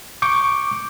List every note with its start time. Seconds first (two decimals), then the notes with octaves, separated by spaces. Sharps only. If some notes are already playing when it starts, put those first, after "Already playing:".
0.22 C#6 D6 G6